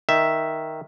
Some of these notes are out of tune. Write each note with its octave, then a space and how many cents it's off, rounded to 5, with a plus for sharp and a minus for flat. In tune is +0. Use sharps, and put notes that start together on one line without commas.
D#3 +5 E5 +0